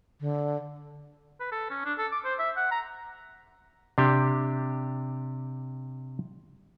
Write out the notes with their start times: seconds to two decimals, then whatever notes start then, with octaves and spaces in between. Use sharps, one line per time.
0.20 D3
1.40 B4
1.52 A4
1.70 C#4
1.85 D4
1.98 A4
2.12 D6
2.25 C5
2.39 E5
2.57 F#5
2.71 A#5
3.98 C3 D4 G4